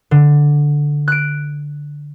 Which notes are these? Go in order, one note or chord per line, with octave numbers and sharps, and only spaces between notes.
D3
F#6 D7